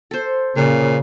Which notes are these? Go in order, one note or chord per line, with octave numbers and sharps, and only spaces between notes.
A4 C5
A#2 C#3